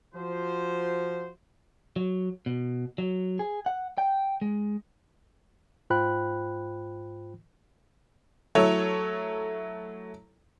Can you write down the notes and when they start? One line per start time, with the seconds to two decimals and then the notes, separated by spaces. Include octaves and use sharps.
0.14 F3 F#4 C5
1.96 F#3
2.46 B2
2.98 F#3
3.39 G#4
3.66 F#5
3.98 G5
4.41 G#3
5.90 G#2 F4 C5 G5 B5 F#6
8.55 F#3 A3 E4 A4 C#5